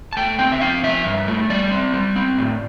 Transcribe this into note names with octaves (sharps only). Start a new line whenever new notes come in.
A5
A3 G5
C4 G5
E5
C4 F5
F3 E5
G2
A3
G3 D5
C4
G3
C4
A2